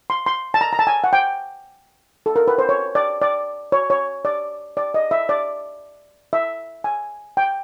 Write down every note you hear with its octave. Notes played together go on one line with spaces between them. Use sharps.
C6
C6
A5
A#5
A#5
A5
G#5
F#5
G5
A4
A#4
B4
C5
C#5
D5
D5
C#5
C#5
D5
D5
D#5
E5
D5
E5
G#5
G5